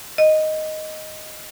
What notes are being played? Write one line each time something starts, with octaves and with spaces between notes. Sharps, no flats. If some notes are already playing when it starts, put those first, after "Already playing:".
D#5